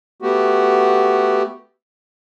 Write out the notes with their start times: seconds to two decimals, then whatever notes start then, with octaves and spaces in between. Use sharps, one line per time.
0.22 A3 B3 F#4 G4